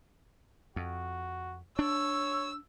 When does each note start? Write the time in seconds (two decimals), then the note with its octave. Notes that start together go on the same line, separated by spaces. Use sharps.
0.76 F2 F#4
1.79 D4 C#5 E6